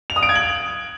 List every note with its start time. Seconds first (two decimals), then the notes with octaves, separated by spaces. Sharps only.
0.10 F7
0.16 D#6
0.23 D7
0.29 G#6
0.35 F#7